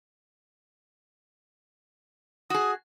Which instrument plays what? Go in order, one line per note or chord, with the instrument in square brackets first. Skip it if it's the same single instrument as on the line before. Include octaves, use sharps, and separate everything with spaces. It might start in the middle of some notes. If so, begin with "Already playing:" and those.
[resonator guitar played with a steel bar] F#4 G#4 [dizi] D#6